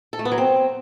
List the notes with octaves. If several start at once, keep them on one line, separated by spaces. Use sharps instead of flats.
A4
A3
B3
F#3
C4